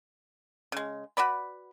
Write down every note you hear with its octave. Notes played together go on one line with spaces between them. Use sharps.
C#3 G#3
F#4 B4 D5 B5